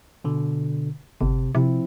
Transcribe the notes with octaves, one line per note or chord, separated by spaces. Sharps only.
B2 D3
G1 C3
C3 F3 C4 E4